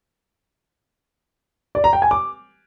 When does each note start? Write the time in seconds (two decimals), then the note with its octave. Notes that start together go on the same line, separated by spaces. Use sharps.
1.75 D5
1.84 A#5
1.93 G5
2.02 G#5
2.11 D6